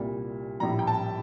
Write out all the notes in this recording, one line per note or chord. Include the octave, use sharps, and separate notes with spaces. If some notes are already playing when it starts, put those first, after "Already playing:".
Already playing: C2 A#2 G3
A#1 A2 G3 A#5
G5
A5